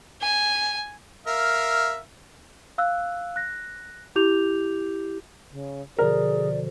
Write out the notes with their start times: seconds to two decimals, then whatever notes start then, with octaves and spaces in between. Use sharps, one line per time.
0.22 G#5
1.27 A#4 E5 F5
2.78 F5 E6 F#6
3.36 F#6 A#6
4.15 E4 G4 D6 G6 F7
5.51 C#3
5.99 B2 D3 F3 G#4 A#4 D5